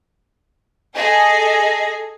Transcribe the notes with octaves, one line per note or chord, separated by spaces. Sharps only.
G#4 A4 D#5